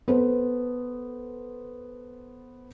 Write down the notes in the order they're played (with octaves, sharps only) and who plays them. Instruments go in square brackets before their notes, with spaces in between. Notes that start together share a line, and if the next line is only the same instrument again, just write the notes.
[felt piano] B3 A4 C5